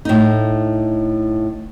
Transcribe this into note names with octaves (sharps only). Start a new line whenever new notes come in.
A2 D#4